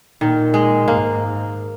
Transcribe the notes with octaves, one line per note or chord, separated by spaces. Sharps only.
A#2 D#3
G#3
G#2 A#3